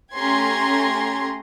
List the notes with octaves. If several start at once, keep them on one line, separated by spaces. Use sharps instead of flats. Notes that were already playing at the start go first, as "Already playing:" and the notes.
A3 C#4 G4 A#5 C6 G#6